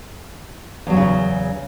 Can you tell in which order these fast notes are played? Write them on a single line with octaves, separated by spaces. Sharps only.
E2 F#3 A2 C#3